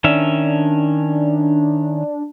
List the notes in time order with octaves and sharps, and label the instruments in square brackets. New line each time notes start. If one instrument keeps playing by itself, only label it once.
[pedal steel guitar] D#3 C#4 E5 [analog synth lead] D4